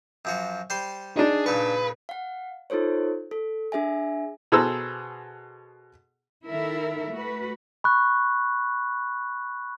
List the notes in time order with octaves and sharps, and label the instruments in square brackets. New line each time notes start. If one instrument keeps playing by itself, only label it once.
[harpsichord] F#2 F3 F#4
G3 C5 C6
[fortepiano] D4 D#4 [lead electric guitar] G#4
[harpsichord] A#2 C#3 C#6 [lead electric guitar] B4
[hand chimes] F5 F#5
D#4 F4 A4 C5 C#5
A4
D4 G#4 E5 G#5
[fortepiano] B2 G#4 A4 C5 A#5 E6
[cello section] D#3 E4 A4 A#4 E5
A3 F#4 B4
[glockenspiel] B5 C#6 F#6